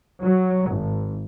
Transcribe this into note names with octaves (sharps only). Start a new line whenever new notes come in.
F#3
G#1